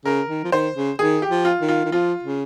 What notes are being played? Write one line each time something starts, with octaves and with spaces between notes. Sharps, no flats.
C#3 A#4
D#3
F3
D#3 C5
C#3
D#3 G#4
G4
F3
F4
D#3
F4
D#3
F3 F4
C#3